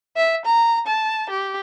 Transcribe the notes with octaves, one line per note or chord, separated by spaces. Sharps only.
E5
A#5
A5
G4